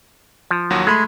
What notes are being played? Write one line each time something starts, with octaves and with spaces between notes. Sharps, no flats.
F3
D#2 F#3 F#4
G#3 A3 B5 C6